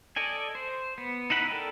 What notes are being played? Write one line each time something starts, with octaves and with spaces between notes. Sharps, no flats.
A4 D5 D#5 G#5
C5
B3
D#4 E4 F#5 B5
A4 A#4 D5 G5